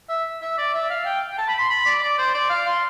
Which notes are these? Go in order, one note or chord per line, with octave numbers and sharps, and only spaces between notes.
E5
E5
D5
E5
F5
G5
G5
A5
B5
C6
B5
D5
D5
C5
D5
F5
C6